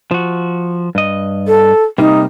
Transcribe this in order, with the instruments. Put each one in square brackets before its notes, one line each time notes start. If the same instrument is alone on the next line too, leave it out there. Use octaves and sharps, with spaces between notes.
[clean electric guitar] F3 F#4
G2 D#5
[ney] A4
[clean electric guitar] C3 G3 A#3 [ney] D#4